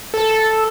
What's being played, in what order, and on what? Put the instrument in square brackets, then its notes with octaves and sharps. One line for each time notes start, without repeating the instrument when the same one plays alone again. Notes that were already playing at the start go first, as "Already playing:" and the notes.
[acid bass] A4